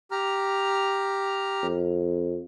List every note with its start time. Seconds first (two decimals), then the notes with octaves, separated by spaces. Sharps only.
0.11 G4 A#5 F6
1.63 F2